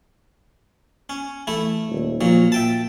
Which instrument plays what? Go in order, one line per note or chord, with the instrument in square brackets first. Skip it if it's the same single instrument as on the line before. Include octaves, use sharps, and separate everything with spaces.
[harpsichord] C#4
[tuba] E3 [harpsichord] A3 E4
[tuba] D#1
[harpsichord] A#2 F#3 [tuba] F3
[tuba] A#2 [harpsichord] E5 G5 A5